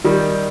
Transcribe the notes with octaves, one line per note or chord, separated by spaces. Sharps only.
D#3 G3